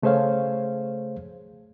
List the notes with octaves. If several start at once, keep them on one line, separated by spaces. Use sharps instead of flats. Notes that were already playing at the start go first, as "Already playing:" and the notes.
C#3 A3 G#4 C5 C#5 F5